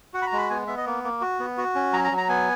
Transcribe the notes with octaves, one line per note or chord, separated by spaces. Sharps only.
F#4 F#5
B5
A#5
G#3
B5
B3 G#5
B3 E5
D#5
A#3
A#3
F#4
B3
F#4
C#4
F#3 A#5
A#5
F#3
A#5
B3 G#5